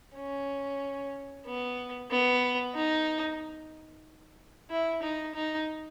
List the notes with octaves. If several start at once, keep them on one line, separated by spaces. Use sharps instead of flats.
C#4
B3
B3
D#4
E4
D#4
D#4